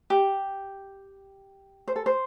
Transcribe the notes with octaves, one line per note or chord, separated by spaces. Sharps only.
G4
C5
A4
C5